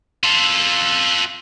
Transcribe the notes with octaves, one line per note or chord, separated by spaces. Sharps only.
F4 A4